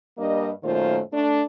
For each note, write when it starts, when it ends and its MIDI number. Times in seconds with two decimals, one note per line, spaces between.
0.18 0.51 43
0.18 0.51 55
0.18 0.51 58
0.18 0.51 62
0.18 0.51 75
0.63 0.99 42
0.63 0.99 46
0.63 0.99 51
0.63 0.99 57
0.63 0.99 65
0.63 0.99 72
1.13 1.42 57
1.13 1.42 62